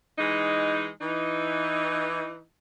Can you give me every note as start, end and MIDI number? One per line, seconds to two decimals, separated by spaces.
0.18 0.88 52
0.18 0.88 56
0.18 0.88 63
1.00 2.43 52
1.00 2.43 63